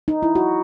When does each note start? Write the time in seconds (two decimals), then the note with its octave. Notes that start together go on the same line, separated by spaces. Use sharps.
0.08 D#4
0.23 E4
0.35 F#4